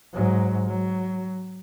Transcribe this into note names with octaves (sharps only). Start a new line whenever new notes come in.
G#2 F#3
F#3